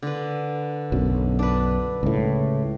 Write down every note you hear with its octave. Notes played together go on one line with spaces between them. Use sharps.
D3 B4
B1 F#2
D4 B4
C#2 A2